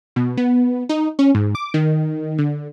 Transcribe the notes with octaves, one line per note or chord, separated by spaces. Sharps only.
B2
B3
D#4
C#4
G#2
D6
D#3
D3